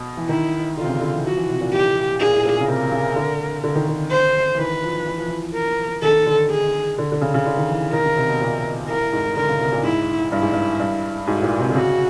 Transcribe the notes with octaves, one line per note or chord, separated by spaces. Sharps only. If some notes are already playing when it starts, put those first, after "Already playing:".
Already playing: B2
E3
D#3 E4
D3 F4
C3
C#3
D3
E3
F3 F#4
E3
C3
A#2
A2 G4
A#2 G#4
A2
A#2
C#3
C3 A#4
C#3
D3
D3
D#3
D3
C5
E3
D#3 B4
F3
E3
F3
E3
A#4
D#3 A4
D3
G#4
D3
D3
C#3
C#3
D3
D#3
E3
D#3 A#4
C#3
C3
B2
A#2
A2 A#4
A2
G#2
A2
D3 A#4
C#3
C3
A#2
G#2 E4
G2 E4
G#2
G2
G2
G#2 F#4
A2
A#2
C3
D3
C#3 F#4